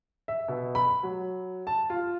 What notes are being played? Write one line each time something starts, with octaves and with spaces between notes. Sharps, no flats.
E5
B2
B5
F#3
A5
F4